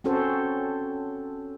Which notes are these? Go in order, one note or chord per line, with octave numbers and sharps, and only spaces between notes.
C4 C#4 F#4 A4 C5